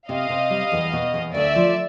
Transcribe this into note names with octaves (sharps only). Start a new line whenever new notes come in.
C3 D#5 F5
C3
G3
E2
B2
E2
D2 D5 E5
F3